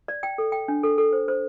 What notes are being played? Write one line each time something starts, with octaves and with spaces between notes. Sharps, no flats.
D5
G5
A4
G5
D4
A4
A4
C5
C5